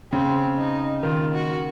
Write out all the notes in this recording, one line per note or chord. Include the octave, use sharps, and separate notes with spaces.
C#3 C4
D#4
D#3 F4
F#4